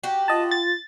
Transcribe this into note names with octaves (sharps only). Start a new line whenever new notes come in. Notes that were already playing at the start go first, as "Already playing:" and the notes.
F#4 G4
F4 D#5 A5
A6